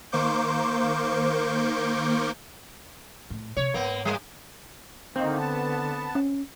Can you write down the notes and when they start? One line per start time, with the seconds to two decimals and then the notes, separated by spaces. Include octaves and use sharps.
0.12 D#3 A#3 C5 C#6 D6 G6
3.30 A2
3.57 C3 C#5
3.74 G#2 A#3 B3
4.05 G3 A3 A#3
5.16 D3 D#3 A#3 C4 D#4
5.38 B3 A5
6.15 C#4